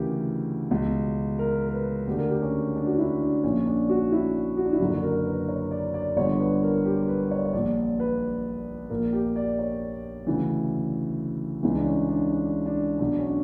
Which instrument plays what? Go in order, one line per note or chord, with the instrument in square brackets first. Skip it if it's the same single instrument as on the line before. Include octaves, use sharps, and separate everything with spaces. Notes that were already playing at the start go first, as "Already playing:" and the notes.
Already playing: [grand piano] D2 C#3 E3 G4 A#4
C#2 B2
A#4
A#4
B4
D2 D3 G4
A#4
G4
C#4
D4
F#4
E4
D4
A#1 A#2 C#4
D4
F#4
D4
E4
F#4
D4
E4
F#1 F#2 D3 F#4
A#4
B4
C#5
D5
D5
G1 G2 D3 C#5
B4
A#4
G4
B4
C#5
D5
C#5
A#1 A#2 D5
B4
A#1 A#2 A#4
G4
D5
C#5
D2 C#3 E3
C#2 C#3 E3
D4
C#4
D4
D4
D4
B1 B2 D4
C#4
D4